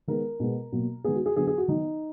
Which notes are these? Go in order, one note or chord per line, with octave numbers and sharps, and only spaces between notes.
D#3 G#3 B3 A#4
B2 G#3 B3
B2 F#3 A#3
D#3 G#3 B3 G#4
F#4
G#4
D3 F#3 B3 G#4
G#4
F#4
D#3 F#3 B3 D#4